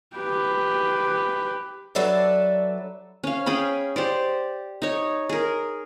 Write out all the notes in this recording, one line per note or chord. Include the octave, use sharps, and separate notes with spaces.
G4 B4
F#3 D4 A4 B4 D5 E5
C#4 F5
C#4 G#4 G5 B5
G4 C5 D5
D#4 C#5
G#4 A#4